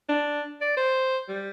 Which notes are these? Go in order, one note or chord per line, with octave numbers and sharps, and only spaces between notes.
D4
D5
C5
G3